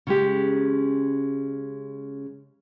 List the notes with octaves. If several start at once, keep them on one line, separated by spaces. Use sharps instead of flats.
C#3 G#3 G4